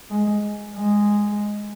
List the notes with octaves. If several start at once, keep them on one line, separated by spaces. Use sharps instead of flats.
G#3
G#3